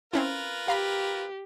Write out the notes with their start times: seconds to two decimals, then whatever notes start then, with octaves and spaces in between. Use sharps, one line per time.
0.14 C4 C#4 E4 F4 A#4 B4
0.68 G4 F5 A#5 B5